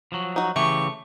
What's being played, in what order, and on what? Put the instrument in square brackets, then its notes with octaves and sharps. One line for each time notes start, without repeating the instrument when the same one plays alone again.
[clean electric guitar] F3 F#3
[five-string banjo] D#4 F#4
[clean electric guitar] C#3 E3 G4 [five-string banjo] A3 [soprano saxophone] C#6